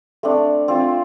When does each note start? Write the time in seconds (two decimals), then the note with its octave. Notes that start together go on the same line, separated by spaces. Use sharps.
0.23 A3 C4 D4
0.68 C4 F4